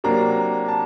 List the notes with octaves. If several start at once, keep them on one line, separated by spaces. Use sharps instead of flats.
C3 F#3 A#3 D4 A#5
A5